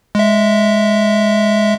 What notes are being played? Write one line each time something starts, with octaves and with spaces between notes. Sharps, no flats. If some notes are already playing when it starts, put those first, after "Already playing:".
G#3 E5